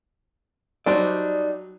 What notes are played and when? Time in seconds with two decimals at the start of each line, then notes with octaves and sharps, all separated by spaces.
0.86 F#3 G3 D4 D#4 C5 D5